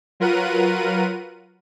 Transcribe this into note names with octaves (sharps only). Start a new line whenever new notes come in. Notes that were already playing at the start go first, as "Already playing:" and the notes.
F#3 F4 A#4 B4 F#5 D#7